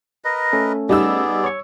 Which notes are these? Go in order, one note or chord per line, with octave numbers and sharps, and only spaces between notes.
A#4 B4 D#5
A3 C#4 A4
G3 B3 D#4 G#4 D5 E6
C#5 C#6